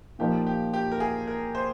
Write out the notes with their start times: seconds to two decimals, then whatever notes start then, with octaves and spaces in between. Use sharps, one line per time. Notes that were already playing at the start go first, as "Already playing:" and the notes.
0.19 A#2 F3 A#3 D#4 G4
0.47 G4
0.74 G4
0.92 A#4
1.00 G#4
1.27 A#4
1.55 C5